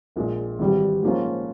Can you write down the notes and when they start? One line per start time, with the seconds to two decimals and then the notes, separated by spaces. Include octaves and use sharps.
0.16 A#1 A#2 G#3
0.59 G#1 G#2 E3 G3
1.03 G#2 F3 A#3 C#4 F4